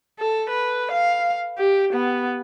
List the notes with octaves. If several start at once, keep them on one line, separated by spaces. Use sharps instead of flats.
A4
B4
F5
G4
B3